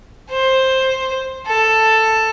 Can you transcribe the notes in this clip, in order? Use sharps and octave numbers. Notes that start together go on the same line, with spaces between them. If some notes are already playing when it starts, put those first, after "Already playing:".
C5
A4